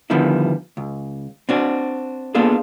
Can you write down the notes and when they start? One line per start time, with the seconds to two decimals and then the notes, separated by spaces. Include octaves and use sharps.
0.10 D3 D#3 F3 G3 B3 E4
0.77 C#2
1.49 C4 D4 F#4
2.35 A#3 B3 D4 F4 G#4 A4